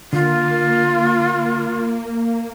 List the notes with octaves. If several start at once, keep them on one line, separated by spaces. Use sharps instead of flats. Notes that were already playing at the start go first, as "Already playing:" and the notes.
D3 A#3 F4